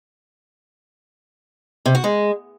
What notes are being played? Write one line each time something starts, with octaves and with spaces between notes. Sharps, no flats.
C3
F#4
G#3